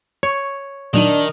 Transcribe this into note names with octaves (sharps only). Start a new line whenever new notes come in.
C#5 C#6
A#2 D#3 F#3 D4 D#4